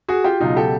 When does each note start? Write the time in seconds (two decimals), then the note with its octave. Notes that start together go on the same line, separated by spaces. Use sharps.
0.08 F#4 G#4
0.24 F4 G4
0.40 C#2 B2 F#3 D#4 F4
0.56 G4 A4